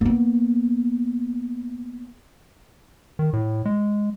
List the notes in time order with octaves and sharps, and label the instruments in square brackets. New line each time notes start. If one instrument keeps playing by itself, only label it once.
[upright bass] A#3 B3
[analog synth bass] D#3
A2
G#3